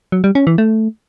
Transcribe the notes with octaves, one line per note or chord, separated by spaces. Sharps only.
F#3
G3
C#4
E3
A3